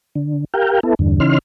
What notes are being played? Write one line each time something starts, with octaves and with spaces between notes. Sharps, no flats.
D3
G4 A#4 F5 G5
B3 E4 A4
E2 G2 D3
C#3 E3 C#4 D#4 C6 F6